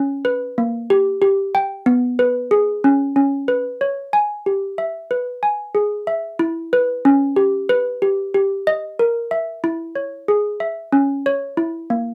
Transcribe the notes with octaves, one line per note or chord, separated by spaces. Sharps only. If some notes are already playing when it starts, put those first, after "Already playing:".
Already playing: C#4
B4
A#3
G4
G4
G5
B3
B4
G#4
C#4
C#4
B4
C#5
G#5
G4
E5
B4
G#5
G#4
E5
E4
B4
C#4
G4
B4
G4
G4
D#5
A#4
E5
E4
C#5
G#4
E5
C#4
C#5
E4
A#3